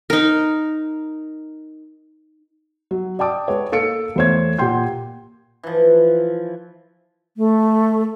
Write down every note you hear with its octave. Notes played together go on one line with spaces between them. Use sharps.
D#4 A#4
F#3
D5 G5 A5 D6 D#6
G#3 B4 C#5
A#3 A4 F5 C#7 D7
E2 A3 C5 C#5 G#6
A#2 G4 F#5 G5 C6 G6
E3 F3
A3